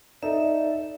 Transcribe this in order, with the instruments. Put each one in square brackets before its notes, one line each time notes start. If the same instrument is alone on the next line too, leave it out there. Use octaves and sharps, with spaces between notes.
[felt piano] D#4 A4 [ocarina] D5 [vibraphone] E5